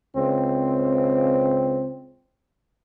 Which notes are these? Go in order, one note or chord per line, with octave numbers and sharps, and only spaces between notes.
C#2 C4